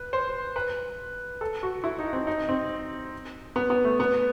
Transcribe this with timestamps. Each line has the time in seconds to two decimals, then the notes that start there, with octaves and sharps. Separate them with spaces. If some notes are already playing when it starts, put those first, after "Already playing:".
Already playing: B4
0.13 C5
0.56 B4
1.41 A4
1.63 F#4
1.84 E4
1.99 D#4
2.13 C4
2.27 D#4
2.49 C4
3.56 B3
3.70 B3
3.85 A3
4.00 B3